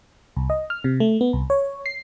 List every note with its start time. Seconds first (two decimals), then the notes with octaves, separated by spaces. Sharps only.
0.37 C2
0.50 D#5
0.70 F6
0.84 C3
1.00 A3
1.21 B3
1.33 C2
1.50 C#5
1.86 C7